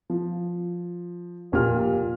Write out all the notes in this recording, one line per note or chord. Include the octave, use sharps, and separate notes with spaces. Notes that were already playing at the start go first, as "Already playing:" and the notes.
F3
F1 A#2 G4 F6